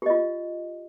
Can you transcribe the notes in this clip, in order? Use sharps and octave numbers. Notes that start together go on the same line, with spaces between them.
F4 G4 D#5